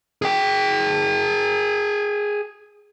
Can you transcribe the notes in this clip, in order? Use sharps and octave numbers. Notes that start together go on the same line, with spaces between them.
G#4 G5